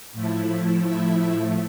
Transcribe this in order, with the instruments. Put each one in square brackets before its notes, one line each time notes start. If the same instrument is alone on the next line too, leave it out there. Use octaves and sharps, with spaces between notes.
[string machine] A2 F3 A3 E4
E4 E5